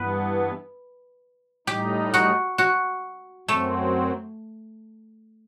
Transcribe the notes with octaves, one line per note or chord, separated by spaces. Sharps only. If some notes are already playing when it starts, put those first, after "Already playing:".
Already playing: G2 E3 B3 B4
A2 G3 D#4 G4
F#4
F#4
F#2 F#3 A3 C4